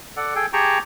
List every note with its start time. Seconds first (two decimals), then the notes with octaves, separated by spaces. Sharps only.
0.17 A4 D5 F#5
0.35 G#4 A4 G5
0.53 G4 G#4 G5 A5 A#5 C#6